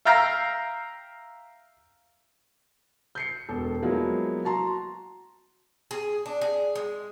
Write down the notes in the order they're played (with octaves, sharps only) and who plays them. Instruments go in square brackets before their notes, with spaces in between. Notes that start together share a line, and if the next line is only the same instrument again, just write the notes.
[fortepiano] E5 F5 G5 A#5 E6 F6
[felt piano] G6 C7 C#7
E1 A4
F3 F#3 G#3 A#3 B3 E4
F#4 A5 A#5 C6
[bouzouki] G#4
D4
G#4
G#3